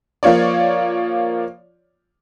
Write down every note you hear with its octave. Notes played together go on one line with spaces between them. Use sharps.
F3 A#3 F4 C#5 D5